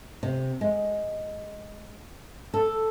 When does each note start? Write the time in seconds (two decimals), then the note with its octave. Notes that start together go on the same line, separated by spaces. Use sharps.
0.23 C3
0.61 G#3
2.54 A4